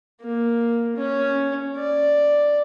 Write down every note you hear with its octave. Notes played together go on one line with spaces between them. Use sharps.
A#3
C#4
D5